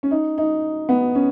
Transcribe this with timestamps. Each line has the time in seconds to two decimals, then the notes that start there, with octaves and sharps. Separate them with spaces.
0.03 C#4
0.11 D#4
0.38 D#4
0.89 B3
1.15 C#4